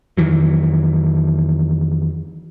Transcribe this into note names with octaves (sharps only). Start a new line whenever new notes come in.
F2 D#3 E3 F#3